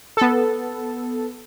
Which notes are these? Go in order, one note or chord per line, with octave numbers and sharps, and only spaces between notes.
B3 A4